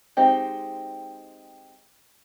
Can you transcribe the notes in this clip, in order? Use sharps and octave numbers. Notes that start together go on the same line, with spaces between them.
G#3 C4 D#4 G4